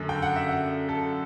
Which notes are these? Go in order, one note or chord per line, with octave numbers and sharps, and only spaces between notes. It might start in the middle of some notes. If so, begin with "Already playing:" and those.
Already playing: F#2 D3 A3
G5
F#5
E5
F#5
A4